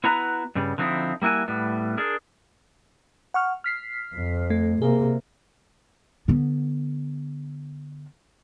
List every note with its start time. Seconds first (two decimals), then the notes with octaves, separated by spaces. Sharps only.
0.04 B3 E4 F#4 B4 A#5
0.55 G2 C#3 G3
0.78 D3 F3 C4 C#4 D#4 E4
1.22 G3 A#3 E4 F#4 G#5
1.48 A2 G3 B3
1.97 D4 G#4 A#4
3.34 F#5 C#6 F6
3.64 F6 B6 C7
4.16 F2
4.50 A3
4.82 C3 A#3 G#4
6.28 D3 B3